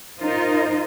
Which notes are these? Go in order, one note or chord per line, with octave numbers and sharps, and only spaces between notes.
D#4 F4 A#4 C5 D#5